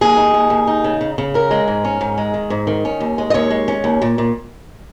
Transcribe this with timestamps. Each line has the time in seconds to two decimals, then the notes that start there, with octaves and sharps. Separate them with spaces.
0.01 D#2 G#4
0.17 D#4
0.34 D#2
0.50 D#2
0.67 D#4
0.84 C#3
1.01 C#3
1.18 C#3
1.34 C#4 A#4
1.51 G#3
1.68 G#2
1.85 C#4
2.01 G#2
2.18 G#3
2.34 D#3
2.50 G#2
2.67 D#3
2.85 C#4
3.00 D#2
3.18 G#3
3.30 D#5
3.34 D#2 C#5
3.50 G#3
3.68 C#4
3.84 D#2
4.02 A#2
4.18 A#2